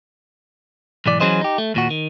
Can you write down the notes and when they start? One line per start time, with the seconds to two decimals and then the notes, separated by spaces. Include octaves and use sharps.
1.06 B1 G#2 E3 D5
1.20 E3 F#3 C#4 G#4 C5 D#5
1.41 D#4 G4
1.58 A3
1.74 D#2 A#2 F#4
1.91 D#3